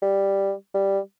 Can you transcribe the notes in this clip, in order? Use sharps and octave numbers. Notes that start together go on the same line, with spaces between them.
G3
G3